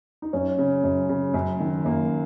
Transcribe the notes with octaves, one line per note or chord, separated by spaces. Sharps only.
D#4
F#2 C#4
C#3
F#2
C#3
F#2
D#3
F#2 A#3